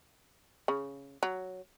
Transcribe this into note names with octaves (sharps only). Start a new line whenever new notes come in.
C#3
F#3